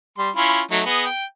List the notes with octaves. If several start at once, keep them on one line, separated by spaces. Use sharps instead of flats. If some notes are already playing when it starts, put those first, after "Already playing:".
G3 C6
C#4 E4 F4
F#3 A3 D#4
B3 G#4 D#5
G5